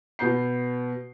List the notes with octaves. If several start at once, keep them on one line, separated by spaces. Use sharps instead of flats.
B2 B3 G6 C7